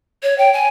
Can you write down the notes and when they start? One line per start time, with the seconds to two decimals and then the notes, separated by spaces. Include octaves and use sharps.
0.23 C#5
0.38 G5
0.53 G#5